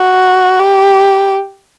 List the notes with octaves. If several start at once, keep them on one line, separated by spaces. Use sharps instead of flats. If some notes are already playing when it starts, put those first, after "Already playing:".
Already playing: F#4
G4